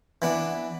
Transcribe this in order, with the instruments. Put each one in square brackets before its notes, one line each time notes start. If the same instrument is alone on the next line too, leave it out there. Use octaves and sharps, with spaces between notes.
[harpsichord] E3 B3 D4